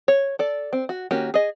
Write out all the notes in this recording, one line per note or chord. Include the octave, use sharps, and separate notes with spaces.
C#5
A4 D5
C4
F#4
D#3 A#3 C#4 F#4 G4
G#4 D#5